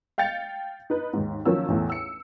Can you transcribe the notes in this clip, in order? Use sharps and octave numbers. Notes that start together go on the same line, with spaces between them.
F5 G5 G6 A6 C#7 F7
D#4 B4
D#2 G#2
D#3 F3 F#3 A#3 C#4 E6
A1 E2 A2
E6 C#7